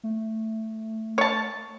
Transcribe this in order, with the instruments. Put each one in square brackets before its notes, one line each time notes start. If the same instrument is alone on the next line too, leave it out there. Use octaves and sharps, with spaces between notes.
[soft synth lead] A3
[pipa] C#5 A5